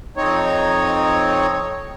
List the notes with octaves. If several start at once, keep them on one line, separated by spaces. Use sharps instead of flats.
F2 C4 D#4 C#5